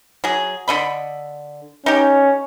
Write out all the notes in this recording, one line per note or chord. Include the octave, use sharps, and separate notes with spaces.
F#3 G#4
D3 D#5 B5
C#4 D#4 G4